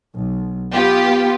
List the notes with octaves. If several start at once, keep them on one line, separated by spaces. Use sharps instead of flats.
B1
B3 F4 G4